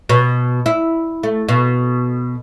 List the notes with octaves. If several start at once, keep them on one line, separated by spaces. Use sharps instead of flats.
B2
E4
A3
B2